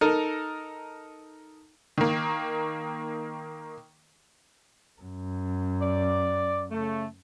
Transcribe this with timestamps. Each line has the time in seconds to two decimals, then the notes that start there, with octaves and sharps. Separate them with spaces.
0.01 D#4 A4 A#4
1.98 D#3 A#3
5.01 F#2
5.81 D5
6.71 C#3 A3